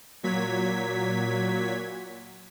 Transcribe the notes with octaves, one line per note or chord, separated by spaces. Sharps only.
A#2 F#3 G#6 B6